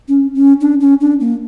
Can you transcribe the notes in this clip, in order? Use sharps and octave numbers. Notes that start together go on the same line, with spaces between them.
C#4
C#4
D4
C#4
D4
A#3